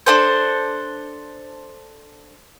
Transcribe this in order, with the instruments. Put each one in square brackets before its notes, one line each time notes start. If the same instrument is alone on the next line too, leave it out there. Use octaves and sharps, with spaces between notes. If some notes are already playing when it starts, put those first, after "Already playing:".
[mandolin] D4 A4 C5